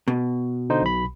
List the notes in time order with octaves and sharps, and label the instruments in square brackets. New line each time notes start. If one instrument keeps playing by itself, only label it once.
[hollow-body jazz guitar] B2
[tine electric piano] D3 D#4 C5
B1 B5